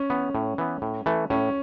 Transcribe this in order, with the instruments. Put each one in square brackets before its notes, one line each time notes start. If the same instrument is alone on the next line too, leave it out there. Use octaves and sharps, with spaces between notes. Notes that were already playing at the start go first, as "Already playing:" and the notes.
Already playing: [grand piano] C#4
[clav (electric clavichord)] E3 B3
A2
E3 B3
A2
E3 A3
[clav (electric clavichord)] A2 [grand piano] C#4